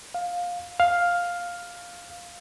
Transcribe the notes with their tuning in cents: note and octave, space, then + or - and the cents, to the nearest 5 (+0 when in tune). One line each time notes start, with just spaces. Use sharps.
F5 +15
F5 +5